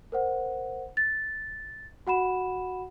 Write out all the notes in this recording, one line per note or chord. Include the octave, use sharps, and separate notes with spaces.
A#4 C5 F#5
A6
F#4 F#5 B5 E7